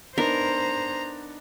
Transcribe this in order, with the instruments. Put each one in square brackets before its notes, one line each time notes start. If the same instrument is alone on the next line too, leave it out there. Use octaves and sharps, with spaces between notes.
[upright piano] B3 D4 D#4 [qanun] A#4 [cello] C5 [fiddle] A#5